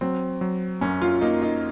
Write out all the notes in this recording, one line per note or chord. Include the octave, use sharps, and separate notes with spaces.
F#3 C4
F#3
F#2 C#4
F4
A#3 D#4
D#4